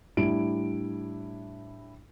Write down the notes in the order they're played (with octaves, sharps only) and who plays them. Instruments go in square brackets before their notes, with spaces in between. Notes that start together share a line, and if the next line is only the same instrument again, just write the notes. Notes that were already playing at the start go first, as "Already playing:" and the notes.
[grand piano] A2 G3 D4 E4 D7